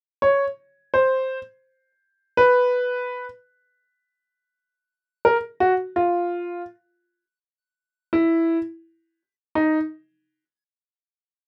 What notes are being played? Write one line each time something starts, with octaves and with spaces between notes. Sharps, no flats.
C#5
C5
B4
A#4
F#4
F4
E4
D#4